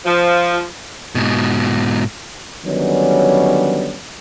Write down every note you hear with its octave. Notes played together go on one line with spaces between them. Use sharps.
F3
G#2 B2
D3 D#3 F#3 G3 B3 C#4